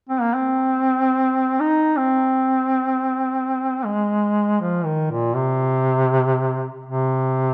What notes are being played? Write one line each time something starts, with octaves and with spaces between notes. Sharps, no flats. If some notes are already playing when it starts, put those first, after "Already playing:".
C4
A#3
C4
D#4
C4
G#3
F3
D#3
A#2
C3
C3